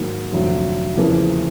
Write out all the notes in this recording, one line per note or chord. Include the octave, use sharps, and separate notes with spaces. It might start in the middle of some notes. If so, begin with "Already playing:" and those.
Already playing: G#2 D#3 F#3 A#3
F1 F2 D3 F#3
E2 C#3 F3 A#3